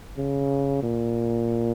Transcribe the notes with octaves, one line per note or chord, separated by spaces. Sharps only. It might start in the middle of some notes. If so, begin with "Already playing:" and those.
C#3
A#2